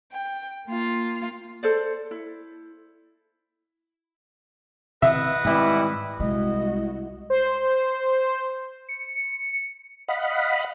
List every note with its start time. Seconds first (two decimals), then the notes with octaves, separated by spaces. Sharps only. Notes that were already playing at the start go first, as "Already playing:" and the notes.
0.12 G5
0.67 A#3 F4
1.63 A4 C5 D5
2.11 E4
5.02 C3 D#3 E3 B4 D#5 E5 F#5
5.45 G#2 D#3 E3 G3 C4 E4
6.20 C2 G#3 E4 F#4 D#5
7.30 C5
8.89 C#7
10.08 D#5 F5 F#5 B5